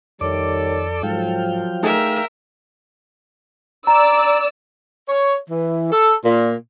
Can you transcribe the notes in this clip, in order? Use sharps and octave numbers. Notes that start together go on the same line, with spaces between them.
F2 D#3 G3 A4 C#5 D5 D6
G#2 F3 F#3 F5 G5
A3 D#4 G#4 A#4 E5
D5 A#5 E6
C#5
E3
A4
A#2